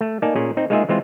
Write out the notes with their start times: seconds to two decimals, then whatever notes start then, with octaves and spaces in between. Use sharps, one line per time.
0.01 A3
0.22 A#3 D#4 D5 G#5 A5
0.36 A#2 C#4 G#4
0.57 C4 D#4
0.70 G#3 A#3 D#4 F4 G#4 E5
0.89 E3 G#3 C4 F4